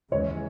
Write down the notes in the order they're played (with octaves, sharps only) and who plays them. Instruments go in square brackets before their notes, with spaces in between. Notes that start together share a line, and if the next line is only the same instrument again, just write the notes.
[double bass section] D#2 C#3 E3 G#3 [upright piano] C#5